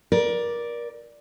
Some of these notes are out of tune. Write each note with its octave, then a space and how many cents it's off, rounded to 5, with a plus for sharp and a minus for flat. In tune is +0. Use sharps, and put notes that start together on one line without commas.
A#4 +30 D5 +0